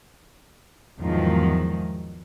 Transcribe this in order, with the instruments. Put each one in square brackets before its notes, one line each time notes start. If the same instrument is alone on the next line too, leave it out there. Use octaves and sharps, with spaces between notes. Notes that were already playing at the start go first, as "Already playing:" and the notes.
[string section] E2 G#2 D#3 F3 F#3